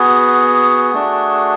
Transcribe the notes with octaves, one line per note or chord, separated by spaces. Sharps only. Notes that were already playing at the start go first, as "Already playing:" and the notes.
Already playing: B3 F#4 G#4
A3 D4 F#4